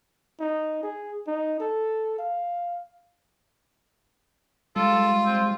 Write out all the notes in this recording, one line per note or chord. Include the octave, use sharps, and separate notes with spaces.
D#4
G#4
D#4
A4
F5
G3 G#3 F4 A4
C4